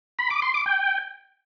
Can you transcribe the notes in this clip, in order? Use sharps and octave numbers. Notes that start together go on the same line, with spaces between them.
B5
D6
C6
D6
G5